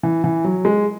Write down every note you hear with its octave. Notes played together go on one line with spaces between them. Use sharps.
E3
E3
F#3
G#3